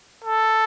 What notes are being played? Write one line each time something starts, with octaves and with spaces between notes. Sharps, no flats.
A4